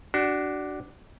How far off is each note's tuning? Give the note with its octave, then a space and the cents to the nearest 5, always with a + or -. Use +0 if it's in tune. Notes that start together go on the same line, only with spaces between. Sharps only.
D4 +0 F#4 +25